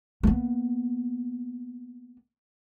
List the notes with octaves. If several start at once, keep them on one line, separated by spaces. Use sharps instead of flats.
A#3 B3